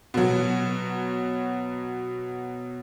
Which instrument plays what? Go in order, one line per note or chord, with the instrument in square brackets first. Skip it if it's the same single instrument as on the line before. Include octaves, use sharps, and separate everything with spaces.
[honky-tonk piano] B2 F#3